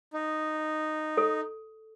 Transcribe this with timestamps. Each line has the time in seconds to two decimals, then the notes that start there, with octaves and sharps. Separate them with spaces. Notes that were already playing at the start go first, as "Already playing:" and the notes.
0.13 D#4
1.17 A4